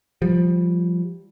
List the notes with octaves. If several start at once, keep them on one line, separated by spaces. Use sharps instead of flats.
F3 G3